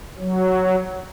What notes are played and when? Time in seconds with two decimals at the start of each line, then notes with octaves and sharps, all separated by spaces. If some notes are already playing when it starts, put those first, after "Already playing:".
0.19 F#3